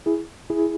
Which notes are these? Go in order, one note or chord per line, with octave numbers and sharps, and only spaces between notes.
E4 G#4
E4 G#4